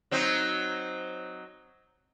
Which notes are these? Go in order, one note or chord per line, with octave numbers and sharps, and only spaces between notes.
F#3 C4 D#4